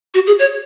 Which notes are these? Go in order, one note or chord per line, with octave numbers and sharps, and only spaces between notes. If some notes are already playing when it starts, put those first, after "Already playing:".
F#4
G#4
C#5